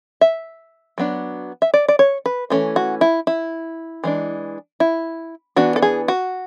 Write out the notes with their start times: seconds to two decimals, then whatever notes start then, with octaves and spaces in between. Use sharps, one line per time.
0.21 E5
0.98 F#3 B3 D4
1.62 E5
1.74 D5
1.88 D5
1.99 C#5
2.26 B4
2.50 E3 A3 C#4
2.76 F#4
3.01 E4
3.27 E4
4.04 E3 G#3 D4
4.80 E4
5.56 E3 B3 D4 F#4
5.76 A4
5.82 G#4
6.08 F#4